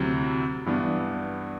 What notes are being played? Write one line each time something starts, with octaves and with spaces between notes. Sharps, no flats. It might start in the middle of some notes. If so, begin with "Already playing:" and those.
Already playing: D2 C3 F#3 C4 E4
G2 E3 B3 D4